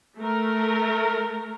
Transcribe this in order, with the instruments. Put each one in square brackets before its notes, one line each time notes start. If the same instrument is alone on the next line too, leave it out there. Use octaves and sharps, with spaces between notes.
[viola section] A3 A#4